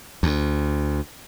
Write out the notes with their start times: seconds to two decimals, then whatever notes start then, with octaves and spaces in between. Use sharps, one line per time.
0.23 D2